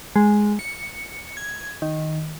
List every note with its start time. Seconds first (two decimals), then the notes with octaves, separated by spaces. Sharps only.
0.16 G#3
0.59 C#7
1.37 G#6
1.82 D#3